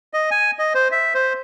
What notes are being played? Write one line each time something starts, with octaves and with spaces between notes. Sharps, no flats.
D#5
G#5
D#5
C5
E5
C5